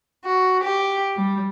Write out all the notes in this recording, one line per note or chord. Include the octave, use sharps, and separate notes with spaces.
F#4
G4
G3